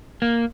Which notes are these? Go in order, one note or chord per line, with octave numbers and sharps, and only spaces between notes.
A#3